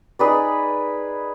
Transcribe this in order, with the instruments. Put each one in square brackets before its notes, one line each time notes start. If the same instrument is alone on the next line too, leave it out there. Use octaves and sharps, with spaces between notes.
[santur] D#4 G#4 B4 D5